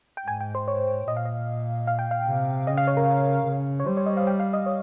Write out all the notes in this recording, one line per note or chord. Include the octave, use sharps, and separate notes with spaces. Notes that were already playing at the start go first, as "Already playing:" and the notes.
G5
G#2 G#5
G5
C5
C#5
A#2 D#5
F5
D#5
F5
G5
F5
C3
C#3 D#5
F5
C#5
A#4
C#3
C#5
G3 C5
C#5
D#5
F5
G5
F5
D#5
C#5